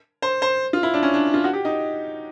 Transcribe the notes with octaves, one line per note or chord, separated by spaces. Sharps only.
C5
C5
F4
E4
D4
C#4
D4
F4
F#4
G4
D#4